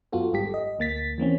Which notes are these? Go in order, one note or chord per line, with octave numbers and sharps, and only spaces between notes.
F#2 B3 F4 F#4 A4
G#1 G#2 G3 G4 A4 B6
D#5
D2 A#3 A6 B6
E3 A#3 C4 C#4